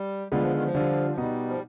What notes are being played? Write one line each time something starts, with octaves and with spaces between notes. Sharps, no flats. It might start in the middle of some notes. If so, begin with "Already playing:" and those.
Already playing: G3
D3 G3 G#3 B3 F4
F3
D#3
F3
D3 G3 D4 F4
F3
B2 G3 B3 D#4
F3